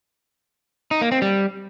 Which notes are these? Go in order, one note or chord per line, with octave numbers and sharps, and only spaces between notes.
D#4
A#3
C4
G3